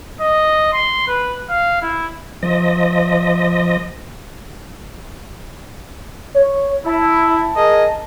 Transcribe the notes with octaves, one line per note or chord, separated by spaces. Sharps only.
D#5
C6
B4
F5
E4
F3 D#5
C#5
E4 A5
G#4 A#4 D#5